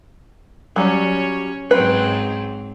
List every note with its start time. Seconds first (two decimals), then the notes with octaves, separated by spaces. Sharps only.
0.76 F#3 G3 C#4 C#5
1.71 G#2 F#3 C4 B4